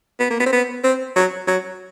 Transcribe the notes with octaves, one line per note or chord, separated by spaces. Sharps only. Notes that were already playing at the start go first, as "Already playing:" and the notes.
B3
A#3
B3
C4
B3
C4
F#3
F#3